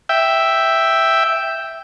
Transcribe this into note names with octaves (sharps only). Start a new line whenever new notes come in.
E5 G5